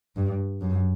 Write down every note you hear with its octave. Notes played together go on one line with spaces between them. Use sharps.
G2
F#2